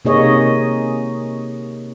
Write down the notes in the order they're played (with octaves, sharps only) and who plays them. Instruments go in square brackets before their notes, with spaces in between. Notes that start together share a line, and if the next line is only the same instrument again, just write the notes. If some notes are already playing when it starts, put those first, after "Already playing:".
[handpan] C3 A#3 D#4 G#4 C#5 D#5